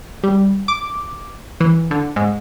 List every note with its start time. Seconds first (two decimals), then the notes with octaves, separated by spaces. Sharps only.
0.23 G3
0.68 D6
1.60 E3
1.91 D3
2.16 G#2